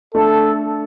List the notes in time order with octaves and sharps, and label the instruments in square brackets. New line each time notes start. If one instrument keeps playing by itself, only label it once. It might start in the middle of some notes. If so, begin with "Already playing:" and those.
[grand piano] A3 D4 [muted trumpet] A4